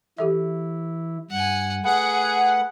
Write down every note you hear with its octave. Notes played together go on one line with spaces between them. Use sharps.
E3 E4 G4 A4 E5
G2 F#5 G#5
A3 G#4 B4 F#5